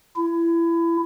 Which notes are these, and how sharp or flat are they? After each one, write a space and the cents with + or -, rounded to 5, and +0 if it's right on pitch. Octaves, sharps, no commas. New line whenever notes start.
E4 +25